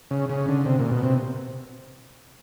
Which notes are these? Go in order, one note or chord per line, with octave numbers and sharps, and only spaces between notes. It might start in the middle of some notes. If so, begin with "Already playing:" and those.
C#3
C#3
D3
C3
A#2
B2
C3